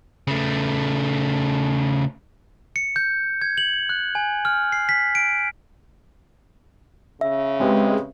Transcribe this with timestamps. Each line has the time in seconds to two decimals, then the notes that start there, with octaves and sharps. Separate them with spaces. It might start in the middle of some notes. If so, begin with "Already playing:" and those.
0.27 C#3 A3
2.76 C#7
2.96 G6
3.42 G#6
3.58 F#7
3.89 F#6
4.15 G#5
4.45 F6
4.72 C7
4.89 B6
5.15 D7
7.21 C#3 E5
7.60 G#3 C4 G4 B4